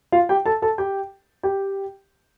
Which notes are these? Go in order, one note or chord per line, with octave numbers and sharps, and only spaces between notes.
F4 F5
G4 G5
A4 A5
A4 A5
G4 G5
G4 G5